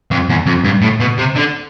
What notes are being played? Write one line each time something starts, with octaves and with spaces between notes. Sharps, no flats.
F2
E2
F2
G2
A2
B2
C3
D3